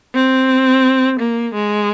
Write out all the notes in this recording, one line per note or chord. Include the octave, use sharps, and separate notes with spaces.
C4
A#3
G#3